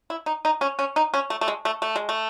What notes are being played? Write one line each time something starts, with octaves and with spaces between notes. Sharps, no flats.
E4
D#4
D#4
C#4
C#4
D#4
C#4
A3
A3
G#3
A3
A3
G#3
A3